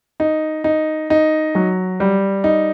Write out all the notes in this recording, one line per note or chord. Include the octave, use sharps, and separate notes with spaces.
D#4
D#4
D#4
F#3
G3
D#4